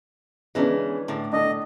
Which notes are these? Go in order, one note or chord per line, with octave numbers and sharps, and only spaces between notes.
C#3 E3 G#3 B3 C#4 D4
A2 D3
D4 A4 D#5